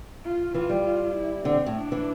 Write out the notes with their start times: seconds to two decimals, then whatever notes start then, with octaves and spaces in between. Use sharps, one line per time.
0.25 F4
0.54 E3 F4
0.70 G3
0.85 F4
1.15 E4
1.45 D3 C4
1.66 A2
1.76 D4
1.92 E3